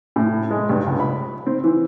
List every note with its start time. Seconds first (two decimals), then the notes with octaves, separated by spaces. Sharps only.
0.16 A2
0.51 G#3
0.69 G2
0.87 C#2
1.00 B5
1.46 C4
1.64 E3